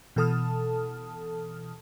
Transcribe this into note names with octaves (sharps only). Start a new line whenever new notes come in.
B2 E3 A4 A5 D#6 F6